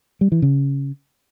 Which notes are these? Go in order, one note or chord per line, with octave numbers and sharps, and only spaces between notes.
G3
E3
C#3